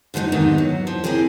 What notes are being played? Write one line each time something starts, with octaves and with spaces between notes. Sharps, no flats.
D3 F3 A3 C4 D#4
G#2 C3 D#3 B3 D#4
F#3
F3
C4 E4 G4 G#4 A#4